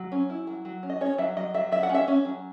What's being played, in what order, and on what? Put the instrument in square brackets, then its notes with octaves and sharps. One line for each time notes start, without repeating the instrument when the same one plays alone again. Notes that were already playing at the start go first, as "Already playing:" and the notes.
Already playing: [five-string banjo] F#3
C#4
E4
F#3
F#3
C#4
D#5
C#4 C#5
F#3 E5
F#3 D#5
F#3 E5
F#3 E5
F#5
C#4
E5
C#4
F#3